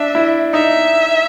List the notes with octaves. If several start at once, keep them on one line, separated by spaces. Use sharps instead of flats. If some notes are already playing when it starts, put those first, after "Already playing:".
Already playing: D4 E5
E4
D#4 E5